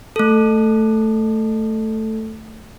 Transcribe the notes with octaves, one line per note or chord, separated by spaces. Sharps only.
A3 A4